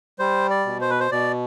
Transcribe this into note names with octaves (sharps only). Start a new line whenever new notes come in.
G3 C5
D5
B2
C5
B4
C5
B2 D5